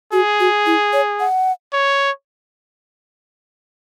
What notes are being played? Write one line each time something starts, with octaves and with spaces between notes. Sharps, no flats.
F#4 G#4
F#4
E4
C#5
F#5
C#5